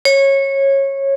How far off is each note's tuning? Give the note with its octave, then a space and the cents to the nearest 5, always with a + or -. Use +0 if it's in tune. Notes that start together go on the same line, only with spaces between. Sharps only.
C#5 -20